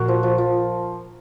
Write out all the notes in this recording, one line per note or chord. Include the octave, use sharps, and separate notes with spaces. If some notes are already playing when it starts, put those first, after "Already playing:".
Already playing: A#1 A#2 F#4 A#4
F3
F3
F3